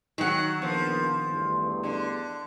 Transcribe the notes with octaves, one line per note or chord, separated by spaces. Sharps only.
D#3 F#3 F#5
A#1 F3 B3
E2 G2 A3
D3